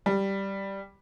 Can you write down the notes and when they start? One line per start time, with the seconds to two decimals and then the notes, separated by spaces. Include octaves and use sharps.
0.06 G3